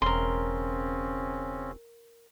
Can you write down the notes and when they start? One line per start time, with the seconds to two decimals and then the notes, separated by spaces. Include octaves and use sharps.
0.02 E1 C#3 C4 C#4 A#4 C6